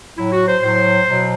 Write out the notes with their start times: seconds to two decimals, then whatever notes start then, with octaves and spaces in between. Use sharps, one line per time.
0.18 A2 F#3 E4
0.33 F#4
0.48 C5
0.63 A2 F#3 C5
1.09 B2 F#3